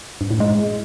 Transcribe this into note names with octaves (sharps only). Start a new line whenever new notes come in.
G2
A2
G#3